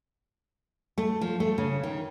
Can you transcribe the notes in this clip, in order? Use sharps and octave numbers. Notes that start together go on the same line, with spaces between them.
A3
F3
A3
C#3
D#3